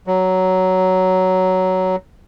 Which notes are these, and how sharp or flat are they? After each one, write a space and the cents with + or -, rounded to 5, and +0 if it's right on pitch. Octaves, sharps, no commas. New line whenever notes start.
F#3 +10